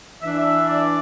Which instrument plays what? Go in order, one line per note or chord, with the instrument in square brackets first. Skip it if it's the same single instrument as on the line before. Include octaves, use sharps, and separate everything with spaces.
[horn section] E3 D4 E5
D5